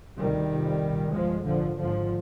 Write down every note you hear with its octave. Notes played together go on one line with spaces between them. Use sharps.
D2 C3 D#3 G3
F1 F2 C3
C2 A#2
G1 G2 F3 G#3
A#1 G#2 D3 F3
G#1 G#2 D3 F3